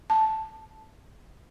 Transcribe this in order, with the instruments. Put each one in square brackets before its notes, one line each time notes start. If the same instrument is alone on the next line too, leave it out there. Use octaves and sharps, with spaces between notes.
[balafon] A5